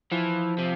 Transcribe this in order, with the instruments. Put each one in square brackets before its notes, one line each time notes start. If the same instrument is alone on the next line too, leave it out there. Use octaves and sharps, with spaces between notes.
[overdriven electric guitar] E3 [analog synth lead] F3
[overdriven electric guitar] C3